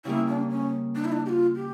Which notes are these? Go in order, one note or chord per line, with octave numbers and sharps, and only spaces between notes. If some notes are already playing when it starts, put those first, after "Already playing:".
C#3 G3 A#3 E4
D4
C#4
D4
E4
D4
G4
F4
G4